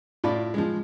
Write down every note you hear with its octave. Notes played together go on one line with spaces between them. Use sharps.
A2 F4 D5 B5
F3 G#3